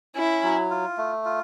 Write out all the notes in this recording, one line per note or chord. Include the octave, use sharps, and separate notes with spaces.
C#4 E4
F#3
F4
A3
F4